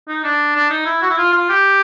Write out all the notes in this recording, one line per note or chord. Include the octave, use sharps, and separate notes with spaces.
D#4
D4
D4
D#4
E4
F#4
E4
F4
F4
G4